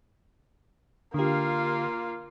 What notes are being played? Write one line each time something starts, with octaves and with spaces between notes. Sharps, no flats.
D3 A#3 F4 G4